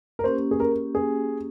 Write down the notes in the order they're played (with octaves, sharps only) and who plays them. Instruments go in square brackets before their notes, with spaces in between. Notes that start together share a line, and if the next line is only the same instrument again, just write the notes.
[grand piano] A#4
[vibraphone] A#3 C#4 G4 [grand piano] C5
[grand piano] G#4
A#4
G#4